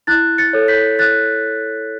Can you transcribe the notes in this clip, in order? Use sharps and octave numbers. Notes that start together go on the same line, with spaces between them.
E4 F#6 A6
A6 C#7
A4 C#5
G6 B6
E4 F#6 A6